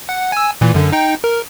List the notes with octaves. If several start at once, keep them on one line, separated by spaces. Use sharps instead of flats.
F#5
G#5 E6
A#2 E3
F#2 D3
D#4 G5
A#4